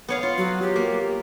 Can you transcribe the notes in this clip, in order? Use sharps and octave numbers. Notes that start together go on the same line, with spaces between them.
B3 C#5 F5
F4
F#3
G4
A#3